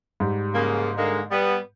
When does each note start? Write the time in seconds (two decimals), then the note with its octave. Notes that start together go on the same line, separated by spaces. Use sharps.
0.20 G#2 G3
0.54 C#3 A#3
0.98 D3 G#3 A#3
1.31 G3 B3